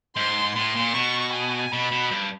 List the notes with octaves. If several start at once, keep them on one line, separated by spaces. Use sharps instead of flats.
G#2 C6
A2 C6
A#2
B2 C#6
G#5
B2 B5
B2
G2